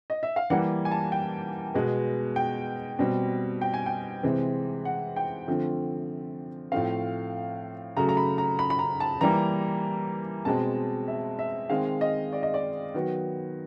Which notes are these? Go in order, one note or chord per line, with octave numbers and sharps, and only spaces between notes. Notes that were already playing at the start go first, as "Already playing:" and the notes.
D#5
E5
F5
E3 G3 A#3 F#5
G#5
A5
G5
B2 G#3 B3
G5
B2 G3 C4
G5
G#5
G5
C3 E3 G#3 C4
F#5
G5
D3 F3 A3 C4
A2 F3 A3 C4 F5
C#3 F#3 A3 A#5
A#5
B5
A#5
B5
B5
A#5
A5
E3 G3 A#3 A#5
B2 G#3 C4 A5
E5
E5
D#3 G#3 C4 F5
D#5
D5
D#5
D5
D#3 F#3 B3